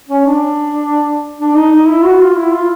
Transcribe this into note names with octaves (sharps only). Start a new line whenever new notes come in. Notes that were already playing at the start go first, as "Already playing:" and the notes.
C#4
D4
D4
D#4
D#4
E4
F#4
F4
E4
F4